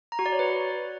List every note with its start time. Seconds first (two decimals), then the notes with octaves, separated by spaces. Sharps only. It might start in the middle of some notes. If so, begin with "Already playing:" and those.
0.12 A#5
0.19 F#4
0.26 D5
0.32 C#5
0.39 B4